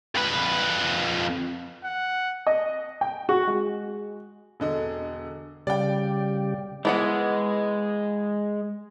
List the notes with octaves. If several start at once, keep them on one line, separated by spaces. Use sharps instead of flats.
F2 B4
F#5
D#5
G5
F#4
G#3
E1 D3 D#5
C#3 G3 G4 D5 F5 G5
E3 G#3 B3 F#5